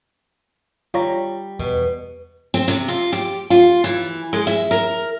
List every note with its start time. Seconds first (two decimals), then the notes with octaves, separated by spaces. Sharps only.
0.94 G3 F4 C#5 A#5
1.59 E2 B2
2.54 C4
2.68 C3
2.88 F4
3.13 G4
3.50 F4
3.84 E3
4.33 G#3
4.47 E5
4.71 A#4